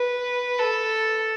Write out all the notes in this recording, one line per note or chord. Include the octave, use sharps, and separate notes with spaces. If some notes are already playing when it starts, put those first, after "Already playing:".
Already playing: B4
A4